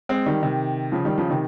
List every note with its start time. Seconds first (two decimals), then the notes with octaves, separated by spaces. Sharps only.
0.09 G#3 C4
0.26 D#3 G3
0.43 C3 D#3
0.92 C#3 F3
1.05 D#3 G3
1.18 C#3 F3
1.30 C3 D#3